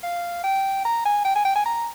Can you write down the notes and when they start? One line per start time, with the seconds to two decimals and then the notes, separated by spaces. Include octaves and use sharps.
0.03 F5
0.44 G5
0.85 A#5
1.05 G#5
1.25 G5
1.36 G#5
1.45 G5
1.55 G#5
1.66 A#5